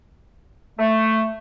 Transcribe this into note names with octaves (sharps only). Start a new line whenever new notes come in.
A3